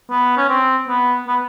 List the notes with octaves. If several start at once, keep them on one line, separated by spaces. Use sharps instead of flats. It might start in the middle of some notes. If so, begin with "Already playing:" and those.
B3
C#4
C4
B3
B3